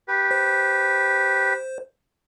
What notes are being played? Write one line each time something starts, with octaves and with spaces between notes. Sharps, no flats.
G4 B4
C5